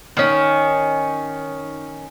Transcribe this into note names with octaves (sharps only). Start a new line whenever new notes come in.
D#3 C#4